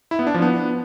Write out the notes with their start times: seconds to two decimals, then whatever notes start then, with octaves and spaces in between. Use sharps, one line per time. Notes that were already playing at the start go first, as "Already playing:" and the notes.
0.11 E4
0.19 B3
0.27 D4
0.34 F3
0.42 B3